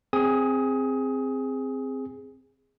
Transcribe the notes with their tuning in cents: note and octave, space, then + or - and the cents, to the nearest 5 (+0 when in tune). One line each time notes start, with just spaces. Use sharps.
C4 +0 G#4 -10 D#6 +25